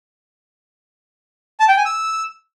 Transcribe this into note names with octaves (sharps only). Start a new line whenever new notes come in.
A5
G5
G#5
E6